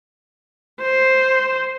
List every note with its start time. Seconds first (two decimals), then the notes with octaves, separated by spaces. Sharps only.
0.81 C5